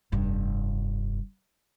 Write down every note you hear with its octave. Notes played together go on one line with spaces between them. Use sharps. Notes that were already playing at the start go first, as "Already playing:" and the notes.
F1 G2